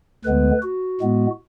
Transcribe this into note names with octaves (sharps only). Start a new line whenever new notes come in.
D2 D3 G#3 B3 B4
F#4
A2 G#3 B3